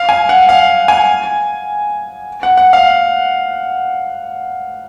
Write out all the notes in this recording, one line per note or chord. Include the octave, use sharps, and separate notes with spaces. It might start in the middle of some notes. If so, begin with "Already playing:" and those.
Already playing: F5
G#5
F#5
F5
G#5
F#5
F#5
F5